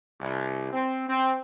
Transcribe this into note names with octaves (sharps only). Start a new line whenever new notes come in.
C2
C4
C4